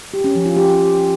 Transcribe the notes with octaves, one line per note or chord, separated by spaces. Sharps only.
G4
C#4
F3
F4
G4